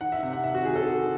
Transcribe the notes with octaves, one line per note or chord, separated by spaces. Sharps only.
D#3 F#5
E5
C3
F#5
D#3 E5
F#4
D#3 G#4
A4
D#3